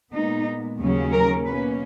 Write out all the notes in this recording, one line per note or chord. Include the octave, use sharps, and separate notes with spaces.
A#2 G#3 B3 D#4
D#2 C#3 F#3 A#3 C#4
A#4
B2 A#3 C#4 B4